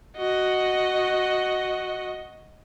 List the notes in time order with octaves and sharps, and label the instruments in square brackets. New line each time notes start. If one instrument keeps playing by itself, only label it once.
[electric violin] F#4 D#5